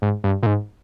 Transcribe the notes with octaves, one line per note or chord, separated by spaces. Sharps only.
G#2
G2
A#2
G#2